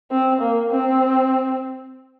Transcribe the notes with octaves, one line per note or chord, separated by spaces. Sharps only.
C4
A#3
C4